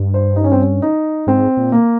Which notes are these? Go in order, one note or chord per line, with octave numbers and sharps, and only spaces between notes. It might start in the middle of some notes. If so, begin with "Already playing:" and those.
Already playing: G2
C5
D#4
C#4
C4
C#4
D#4
G#2 C4
A#2
A#3